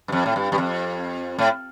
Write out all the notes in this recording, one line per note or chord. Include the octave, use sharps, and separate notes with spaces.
G2
F2
A2
G2
G2
F2
A2